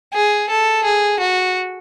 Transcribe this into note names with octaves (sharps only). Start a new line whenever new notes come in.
G#4
A4
G#4
F#4